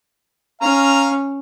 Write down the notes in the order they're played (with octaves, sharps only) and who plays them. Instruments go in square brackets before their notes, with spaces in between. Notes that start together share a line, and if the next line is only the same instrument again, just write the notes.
[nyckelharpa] C#4 [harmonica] F5 A#5